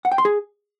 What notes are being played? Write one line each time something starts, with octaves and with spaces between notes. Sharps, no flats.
F#5
G5
C6
G#4